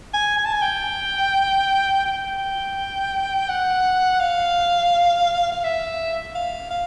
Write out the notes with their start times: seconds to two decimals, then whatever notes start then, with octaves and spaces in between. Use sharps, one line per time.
0.14 G#5
0.38 G#5
0.45 A5
0.53 G#5
0.62 G5
2.05 G5
3.49 F#5
4.20 F5
5.52 F5
5.64 E5
6.35 F5
6.70 F5